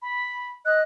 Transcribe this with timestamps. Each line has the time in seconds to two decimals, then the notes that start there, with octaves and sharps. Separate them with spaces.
0.02 B5
0.65 D#5 F#6